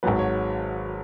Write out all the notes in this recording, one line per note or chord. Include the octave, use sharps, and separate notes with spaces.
G#1 G#2 F#3 B4
C#5